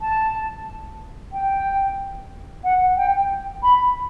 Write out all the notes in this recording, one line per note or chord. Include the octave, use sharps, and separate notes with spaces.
A5
G5
F#5
G5
B5